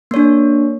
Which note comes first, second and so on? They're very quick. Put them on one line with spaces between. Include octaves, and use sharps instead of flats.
A#3 C#5 D4